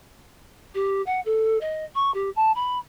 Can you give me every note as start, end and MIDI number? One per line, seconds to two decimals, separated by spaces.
0.74 1.02 67
1.06 1.20 78
1.25 1.57 69
1.60 1.84 75
1.95 2.12 85
2.14 2.30 67
2.36 2.51 81
2.55 2.77 83